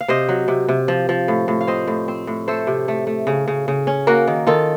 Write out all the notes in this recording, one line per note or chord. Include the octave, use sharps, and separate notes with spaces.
F5
C3 C5 D#5
F#3
C3
C3
F3
F3
A2
A2
F5
C4 C5 D#5
A2
C4
A2
A3 A4 C5
C3
A3
A3
C#3
C#3
C#3
C#4
A#3 F#4 A#4
D#3
D#3 F4 A4